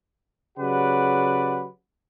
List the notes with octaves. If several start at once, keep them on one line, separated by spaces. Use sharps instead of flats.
C#3 F#3 G4 B4 D5 F#5